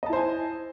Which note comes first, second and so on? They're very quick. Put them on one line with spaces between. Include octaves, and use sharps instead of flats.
D#5 A5 E4 C5 G#5